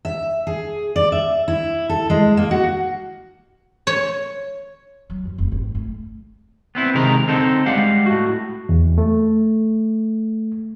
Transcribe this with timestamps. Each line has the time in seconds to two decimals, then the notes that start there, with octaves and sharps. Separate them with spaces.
0.05 E5
0.47 G#4
0.96 D5
1.12 E5
1.48 E4
1.89 A4
2.10 G#3
2.37 A#3
2.51 F#4
3.87 C#5
5.10 F#3
5.25 F#2
5.38 F1
5.52 G#1
5.75 A3
6.75 B3 C4 E4
6.94 C3 D#3 G#3 A#4
7.27 D3 C4 D#4 A4
7.66 G3 G#3 F5 F#5
8.06 A2 F#4
8.69 E2
8.98 A3